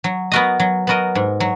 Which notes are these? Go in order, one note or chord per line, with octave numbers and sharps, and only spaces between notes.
F#3
B3 F#4 A#4 D#5
F#3
B3 F#4 A#4 D#5
G#2
F#3